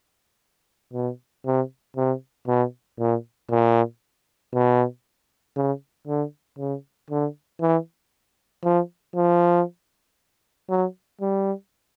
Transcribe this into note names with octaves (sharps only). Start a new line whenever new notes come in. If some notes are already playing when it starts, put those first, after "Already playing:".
B2
C3
C3
B2
A#2
A#2
B2
C#3
D3
C#3
D3
E3
F3
F3
F#3
G3